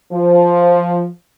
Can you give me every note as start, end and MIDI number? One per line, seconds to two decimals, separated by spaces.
0.12 1.07 53